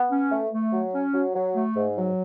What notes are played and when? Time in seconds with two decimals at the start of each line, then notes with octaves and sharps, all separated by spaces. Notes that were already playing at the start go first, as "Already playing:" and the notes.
Already playing: B3
0.11 C#4
0.31 A3
0.52 A3
0.73 F#3
0.93 C#4
1.14 F#3
1.34 F#3
1.55 A3
1.76 G#2
1.96 F#3